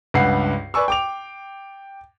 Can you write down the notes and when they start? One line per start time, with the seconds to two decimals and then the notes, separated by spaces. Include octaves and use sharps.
0.14 C#2 G2 B4 F#5 C7
0.74 B4 D5 G#5 C#6 E6
0.88 G5 D6 F7